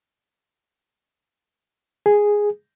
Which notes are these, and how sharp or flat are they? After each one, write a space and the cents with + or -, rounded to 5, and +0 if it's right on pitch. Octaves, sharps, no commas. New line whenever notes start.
G#4 -5